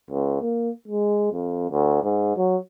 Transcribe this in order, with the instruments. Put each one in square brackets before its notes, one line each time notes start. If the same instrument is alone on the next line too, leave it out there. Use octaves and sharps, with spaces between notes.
[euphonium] C#2
A#3
G#3
F2
D2
G#2
F#3